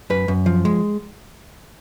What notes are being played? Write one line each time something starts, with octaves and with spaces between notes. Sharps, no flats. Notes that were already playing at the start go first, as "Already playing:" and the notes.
F#2 B4
F#2
F3
G#3